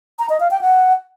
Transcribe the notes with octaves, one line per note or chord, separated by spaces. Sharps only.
A#5
D#5
F5
G5
F#5